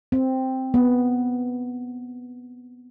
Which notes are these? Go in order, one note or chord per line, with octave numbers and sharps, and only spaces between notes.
C4
B3